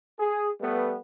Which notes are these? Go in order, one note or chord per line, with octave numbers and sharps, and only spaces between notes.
G#4
G3 A3 B3